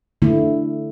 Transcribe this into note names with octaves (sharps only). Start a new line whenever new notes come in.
D3 A3 E4